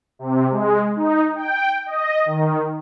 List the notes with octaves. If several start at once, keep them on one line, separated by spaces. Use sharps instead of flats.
C3
G#3
D#4
G5
D#5
D#3